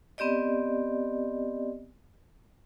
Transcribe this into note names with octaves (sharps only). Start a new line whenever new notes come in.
B3 C4 G4 D5 D#5